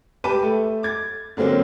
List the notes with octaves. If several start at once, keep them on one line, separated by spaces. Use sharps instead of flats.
G4 B4 A5 D6 D#7
A3
D6 G#6 A6
D3 F#3 A#3 C4 C#4